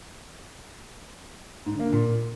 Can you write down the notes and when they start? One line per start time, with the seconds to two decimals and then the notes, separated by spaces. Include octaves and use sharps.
1.66 G#2
1.73 D3
1.79 A#3
1.86 D3
1.93 A#2